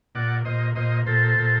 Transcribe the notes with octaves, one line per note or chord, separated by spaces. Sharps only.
A#2 D5 F#5
A#2 C5 D#5
A#2 C5 D#5
A#2 A4 C5
A#2